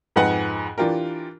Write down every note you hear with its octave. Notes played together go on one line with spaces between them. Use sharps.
F2 G#2 D#4 B4 F#5 G#5
E3 D4 F4 G4 A#4